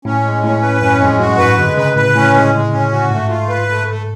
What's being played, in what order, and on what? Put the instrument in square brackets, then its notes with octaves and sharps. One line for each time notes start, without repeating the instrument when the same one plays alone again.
[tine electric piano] A2 [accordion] C#4
[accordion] G#3
[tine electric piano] A2 [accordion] C#4
[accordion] B4
[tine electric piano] F#2 [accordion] C#4
[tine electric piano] F2 [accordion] G#3
[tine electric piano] F#2 [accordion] F#4
[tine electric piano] G#2 [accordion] B4
[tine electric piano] D3 [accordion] G#3
[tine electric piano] C#3 [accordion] B4
[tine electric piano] A2 [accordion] B4
[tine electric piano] A2 [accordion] C#4
[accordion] G#3
G#3
C#4
F#4
[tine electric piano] G#2 [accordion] A3
[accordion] F4
B4
A3
A3